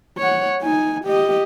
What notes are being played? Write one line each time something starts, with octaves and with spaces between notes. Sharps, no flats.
C#5 F#5
D#4 G#5
G4 D#5